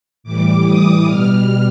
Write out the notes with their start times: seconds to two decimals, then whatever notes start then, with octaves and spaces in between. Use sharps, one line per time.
0.23 A2 E3 G3 D6
0.65 D#6
1.06 B2 G3 F6